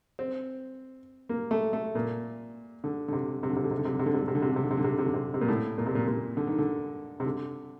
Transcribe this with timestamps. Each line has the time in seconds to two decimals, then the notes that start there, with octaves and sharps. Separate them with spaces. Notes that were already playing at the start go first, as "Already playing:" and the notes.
0.19 C4
1.29 A#3
1.51 A3
1.73 A3
1.95 A#2
2.84 D3
3.08 D3
3.13 C3
3.43 C3
3.50 D3
3.57 C3
3.64 D3
3.71 C3
3.78 D3
3.85 C3
3.92 D3
3.99 C3
4.06 D3
4.14 C3
4.21 D3
4.28 C3
4.35 D3
4.42 C3
4.49 D3
4.56 C3
4.64 D3
4.71 C3
4.77 D3
4.84 C3
4.92 D3
4.98 C3
5.06 D3
5.14 C3
5.34 C3
5.41 A#2
5.48 A2
5.78 A#2
5.86 C3
5.95 A#2
6.07 A#2
6.37 D3
6.47 D#3
6.58 D3
7.20 C3
7.26 D3